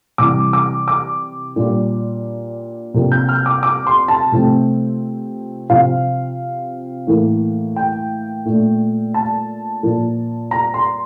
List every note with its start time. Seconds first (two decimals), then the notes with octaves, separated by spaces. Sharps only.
0.18 C3 E3 G3 D6
0.53 D6
0.88 D6
1.56 A#2 G3 A#3 D4
2.94 C3 F3 A#3 D4
3.12 G6
3.29 F6
3.46 D6
3.63 D6
3.87 C6
4.08 A5
4.32 C3 F3 A3 C4
5.70 C3 F3 C4 F5
7.07 A2 E3 A#3
7.76 G5
8.45 A#2 A3 D4
9.14 A5
9.83 A#2 F3 A#3
10.51 A#5
10.74 C6